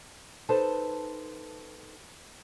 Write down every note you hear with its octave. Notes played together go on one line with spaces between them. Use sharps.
D#4 A4 B4 C5 A5